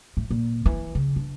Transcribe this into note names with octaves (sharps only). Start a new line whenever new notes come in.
A2
A#2
E3
C#3
D4